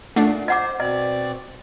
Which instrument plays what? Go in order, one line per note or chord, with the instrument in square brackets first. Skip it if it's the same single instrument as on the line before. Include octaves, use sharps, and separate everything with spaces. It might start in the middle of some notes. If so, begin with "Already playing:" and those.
[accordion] A#2 [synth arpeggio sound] A3 D4 [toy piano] F#5
[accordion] C5 [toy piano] D#5 F#5 D6
[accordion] B2 C4 D5 [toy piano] D#5